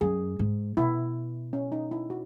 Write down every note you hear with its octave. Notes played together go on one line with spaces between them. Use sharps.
F#2 G#4
G#2
B2 E4
C#4
D#4
E4
F#4